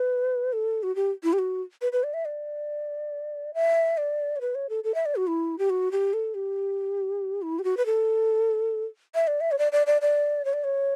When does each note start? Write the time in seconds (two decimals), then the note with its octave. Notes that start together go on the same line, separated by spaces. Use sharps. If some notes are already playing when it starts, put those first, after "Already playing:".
Already playing: B4
0.53 A4
0.83 F#4
0.96 G4
1.23 E4
1.33 G4
1.39 F#4
1.82 B4
1.92 B4
2.03 D5
2.14 E5
2.25 D5
3.54 E5
3.97 D5
4.36 C#5
4.41 B4
4.55 C#5
4.69 A4
4.84 A4
4.94 E5
5.06 D5
5.16 F#4
5.27 E4
5.58 G4
5.70 F#4
5.92 G4
6.13 A4
6.34 G4
7.42 E4
7.59 G4
7.64 F#4
7.77 B4
7.86 A4
9.15 E5
9.27 D5
9.41 E5
9.52 C#5
9.59 D5
9.72 D5
9.87 D5
10.02 D5
10.45 C#5
10.53 D5
10.64 C#5